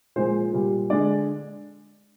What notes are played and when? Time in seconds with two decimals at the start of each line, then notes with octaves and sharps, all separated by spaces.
0.16 A#2 F3 G#3 C5
0.53 A#2 G3
0.90 D3 G#3 D5